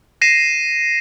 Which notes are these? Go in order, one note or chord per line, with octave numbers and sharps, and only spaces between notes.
A#6 C7 D#7 E7